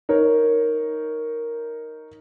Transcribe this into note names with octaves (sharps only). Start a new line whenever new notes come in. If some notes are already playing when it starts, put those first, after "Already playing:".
D#4 A#4 C#5